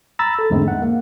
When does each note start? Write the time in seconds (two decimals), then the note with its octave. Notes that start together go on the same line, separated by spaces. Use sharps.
0.19 A#5 B5 E6 A6
0.39 A4
0.50 E2 G#2 D3 G#3 A3 C4
0.68 F#5
0.82 A#3